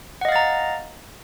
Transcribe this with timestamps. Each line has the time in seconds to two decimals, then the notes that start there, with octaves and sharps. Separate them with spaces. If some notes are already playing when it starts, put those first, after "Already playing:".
0.21 F#5
0.25 D#5
0.29 F5
0.32 A6
0.36 A#5